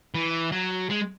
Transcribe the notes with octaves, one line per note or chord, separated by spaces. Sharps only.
E3
F#3
G#3